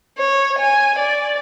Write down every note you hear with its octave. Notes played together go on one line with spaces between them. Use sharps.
C#5
G#5
D5